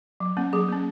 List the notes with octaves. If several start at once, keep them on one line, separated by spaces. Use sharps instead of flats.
F#3
A#3 C#4
F#3 G#4
A#3 C#4